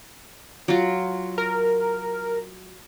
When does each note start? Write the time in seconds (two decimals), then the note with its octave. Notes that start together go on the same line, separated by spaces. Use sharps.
0.68 F#3 F4
1.38 A#4